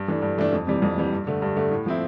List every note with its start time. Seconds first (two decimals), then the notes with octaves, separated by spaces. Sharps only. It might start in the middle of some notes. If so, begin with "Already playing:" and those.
Already playing: G2
0.08 E3 A3 D4
0.22 G2
0.38 E3 A3 D4
0.53 F2
0.67 C3 E3 G3
0.82 F2
0.98 C3 E3 G3
1.12 G2
1.27 D3 A3
1.42 G2
1.56 D3 A3
1.71 A2
1.86 F3 C4 E4